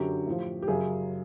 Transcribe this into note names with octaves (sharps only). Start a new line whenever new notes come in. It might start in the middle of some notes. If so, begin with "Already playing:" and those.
Already playing: F#2 D3 F#3 G4
A2 F3
G4
F#2 C#3 F#3 G#4